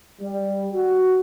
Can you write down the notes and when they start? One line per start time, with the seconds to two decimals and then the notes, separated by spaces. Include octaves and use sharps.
0.20 G3
0.74 F#4